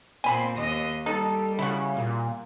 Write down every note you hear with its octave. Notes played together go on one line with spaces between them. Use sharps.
A#2 C4 G#5 B5
D#2 D#5
G3 D#4 A4
C#3 E4 F#4
A#2